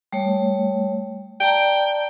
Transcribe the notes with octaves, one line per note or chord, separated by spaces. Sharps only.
G3 A3 C#5
D5 G5 A5 A#5